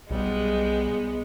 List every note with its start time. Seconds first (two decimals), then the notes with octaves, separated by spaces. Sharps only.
0.10 B1 G3 G#3 B3